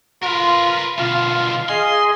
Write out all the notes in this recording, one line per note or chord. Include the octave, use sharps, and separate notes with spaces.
F4 A#4 B4
B2 D3 F4 F5
G#4 D#5 C6